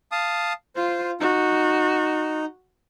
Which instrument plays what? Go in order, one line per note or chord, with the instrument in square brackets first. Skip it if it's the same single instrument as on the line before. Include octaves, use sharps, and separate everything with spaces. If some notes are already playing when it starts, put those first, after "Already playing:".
[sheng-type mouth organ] F5 A5 D#6
[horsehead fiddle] F4 [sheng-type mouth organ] C5
[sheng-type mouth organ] D#4 [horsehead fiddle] F#4